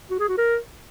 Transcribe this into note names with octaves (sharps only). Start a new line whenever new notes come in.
F#4
G#4
F#4
A#4